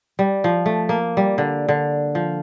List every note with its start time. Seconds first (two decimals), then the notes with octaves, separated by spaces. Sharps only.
0.19 G3
0.44 F3
0.66 A3
0.89 A#3
1.17 G3
1.38 D3
1.69 D3
2.15 F3